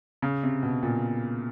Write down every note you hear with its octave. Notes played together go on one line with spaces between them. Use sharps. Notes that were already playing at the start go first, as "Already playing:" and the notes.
C#3
C3
B2
A#2